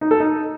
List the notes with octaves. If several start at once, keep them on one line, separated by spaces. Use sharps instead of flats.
D#4
A4
D#4